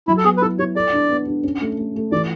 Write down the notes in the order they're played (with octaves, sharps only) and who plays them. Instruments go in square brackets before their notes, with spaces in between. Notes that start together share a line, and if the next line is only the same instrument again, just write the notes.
[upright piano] F#3 [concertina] E4
[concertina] A4
[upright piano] B3 [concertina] G#4
[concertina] B4
[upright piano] E4 [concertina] A4
[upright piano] E4 [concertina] C#5
[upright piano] A4 [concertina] D5
[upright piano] D4
B3
D4
C#4
A3
A3
A3
[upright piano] E3 [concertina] D5